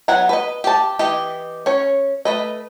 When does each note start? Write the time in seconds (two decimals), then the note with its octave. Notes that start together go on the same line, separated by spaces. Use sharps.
0.08 F#3 B3 F#5 G#5 A#5
0.29 B4 D#5
0.64 G4 A5
0.99 E3 G4 D#5
1.66 C#4 C#5
2.25 A3 B4 D#5